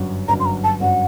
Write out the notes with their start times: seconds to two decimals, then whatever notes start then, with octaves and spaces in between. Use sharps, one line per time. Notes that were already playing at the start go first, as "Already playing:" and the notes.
Already playing: G1 F#2 F#3
0.28 G1 F#2 F#3 A#5
0.40 C6
0.46 A#5
0.64 A5
0.80 G1 F#2 F#3 F#5